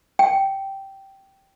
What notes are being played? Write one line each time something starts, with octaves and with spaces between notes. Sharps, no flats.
G5